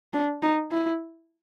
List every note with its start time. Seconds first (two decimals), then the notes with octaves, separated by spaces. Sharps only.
0.13 D4
0.43 D#4
0.71 E4